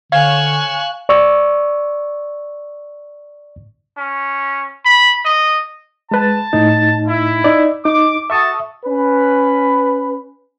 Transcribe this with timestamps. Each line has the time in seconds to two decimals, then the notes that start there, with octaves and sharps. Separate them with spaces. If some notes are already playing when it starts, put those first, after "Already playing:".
0.12 D3 C#5 F5 G#5 F#6 E7
1.09 D5 C#6 E6
3.97 C#4
4.85 B5
5.25 D#5
6.11 G#3 B4 A5
6.53 A2 D#4
7.07 E4
7.44 D#4 D5
7.85 D#4 D6
8.30 F#4 A4 E5 A5 C#6 D#6
8.84 C#4 B4